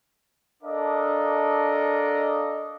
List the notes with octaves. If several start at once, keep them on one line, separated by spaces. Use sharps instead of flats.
D4 A4 A#4 D#5 F5 D6